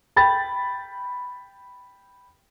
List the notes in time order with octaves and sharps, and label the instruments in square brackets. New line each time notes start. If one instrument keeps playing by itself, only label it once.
[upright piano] G5 B5 A6